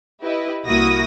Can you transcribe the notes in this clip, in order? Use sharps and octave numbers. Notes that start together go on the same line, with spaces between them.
E4 G4 B4 D#5
C2 A#3 E4 F#4 D#6 A#6